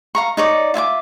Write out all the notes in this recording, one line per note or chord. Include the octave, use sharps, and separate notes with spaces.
F5 A#5 C#6
D#4 C#5 D5
F4 E5 G#5 D6